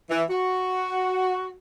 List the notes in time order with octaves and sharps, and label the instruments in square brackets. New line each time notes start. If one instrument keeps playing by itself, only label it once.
[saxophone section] E3
F#4